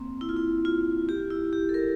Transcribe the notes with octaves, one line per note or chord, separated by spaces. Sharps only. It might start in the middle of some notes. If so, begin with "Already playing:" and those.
Already playing: A#3 C4
E4
F4
E4
F4
G4
E4
G4
A4
A#4